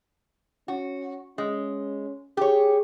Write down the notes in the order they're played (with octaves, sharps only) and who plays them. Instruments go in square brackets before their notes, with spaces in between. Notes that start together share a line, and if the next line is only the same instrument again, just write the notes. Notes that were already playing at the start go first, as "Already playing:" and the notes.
[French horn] C#4 [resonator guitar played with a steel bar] F#4
[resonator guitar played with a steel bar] G#3 [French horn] C#4
[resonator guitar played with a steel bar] G4 C#5 [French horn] G#4